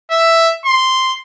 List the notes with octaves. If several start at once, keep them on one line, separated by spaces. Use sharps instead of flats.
E5
C6